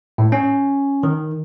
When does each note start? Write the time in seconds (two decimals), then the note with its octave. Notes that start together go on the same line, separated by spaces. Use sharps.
0.18 A2
0.32 C#4
1.03 D#3